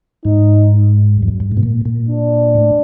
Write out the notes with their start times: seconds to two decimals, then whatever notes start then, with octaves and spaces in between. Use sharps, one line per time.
0.25 G#2 D#4
1.17 G2
1.23 F2
1.28 F#2
1.40 G2
1.52 G#2
1.57 B2
1.63 A#2
1.85 A#2
2.08 D4
2.55 A2